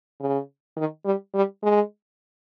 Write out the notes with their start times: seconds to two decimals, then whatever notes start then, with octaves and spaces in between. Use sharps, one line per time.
0.20 C#3
0.77 D#3
1.05 G3
1.34 G3
1.63 G#3